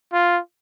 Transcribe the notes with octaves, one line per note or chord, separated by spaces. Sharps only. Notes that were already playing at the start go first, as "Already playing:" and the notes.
F4